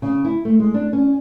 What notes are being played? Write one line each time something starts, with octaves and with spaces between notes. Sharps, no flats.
C#3
E4
A3
G#3
D4
C#4